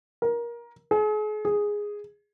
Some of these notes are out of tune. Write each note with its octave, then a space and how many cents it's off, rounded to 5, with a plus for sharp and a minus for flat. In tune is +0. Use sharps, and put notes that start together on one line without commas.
A#4 +20
G#4 +40
G#4 -5